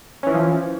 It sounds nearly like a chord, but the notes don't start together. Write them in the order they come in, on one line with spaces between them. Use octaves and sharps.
C#4 E3 E4 F3